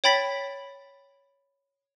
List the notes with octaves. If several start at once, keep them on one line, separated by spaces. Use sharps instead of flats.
C#5 G5 B5 A6 B6